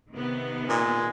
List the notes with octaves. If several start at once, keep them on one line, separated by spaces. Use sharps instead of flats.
C3 D#3 B3
A#2 G#3